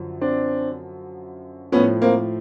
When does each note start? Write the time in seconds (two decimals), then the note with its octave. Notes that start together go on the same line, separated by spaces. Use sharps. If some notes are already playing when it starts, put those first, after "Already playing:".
Already playing: F#2 D3 F3
0.21 C4 D4
1.72 A2 F3 B3 C#4
2.02 A#3 C4